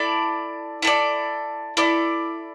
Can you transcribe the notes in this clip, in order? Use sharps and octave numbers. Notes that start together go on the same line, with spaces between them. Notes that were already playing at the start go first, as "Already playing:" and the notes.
Already playing: E4 A4 D5
E4 A4 D5
E4 A4 D5